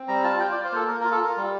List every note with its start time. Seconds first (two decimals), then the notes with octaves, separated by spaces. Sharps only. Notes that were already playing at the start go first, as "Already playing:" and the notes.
Already playing: C4
0.08 G3 A#5
0.24 F4 A5
0.40 F4 G5
0.52 D5
0.56 F4
0.65 C5
0.72 A#3 A4
0.88 A#3 A#4
1.01 A#4
1.05 F4
1.12 A4
1.21 F4 A#4
1.37 G3